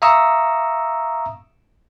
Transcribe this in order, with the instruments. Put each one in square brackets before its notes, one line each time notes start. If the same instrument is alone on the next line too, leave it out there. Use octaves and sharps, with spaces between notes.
[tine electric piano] E5 F5 A#5 C#6 D#6 E6